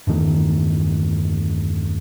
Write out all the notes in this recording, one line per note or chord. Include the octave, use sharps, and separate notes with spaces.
E2 G2 D#3 A3